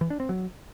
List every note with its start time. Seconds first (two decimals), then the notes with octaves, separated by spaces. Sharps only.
0.01 E3
0.10 D4
0.20 C4
0.29 F#3